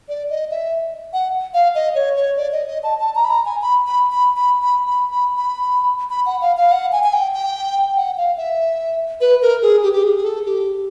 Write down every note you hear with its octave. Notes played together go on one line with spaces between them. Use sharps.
D5
D#5
E5
F#5
F5
D#5
C#5
C#5
D5
D#5
D#5
A5
A5
A#5
B5
A#5
G#5
B5
B5
B5
B5
B5
B5
B5
B5
B5
F#5
F5
F5
F#5
G#5
G#5
G5
G5
F#5
F5
E5
B4
A#4
G#4
G4
G4
G#4
G#4
A4
G4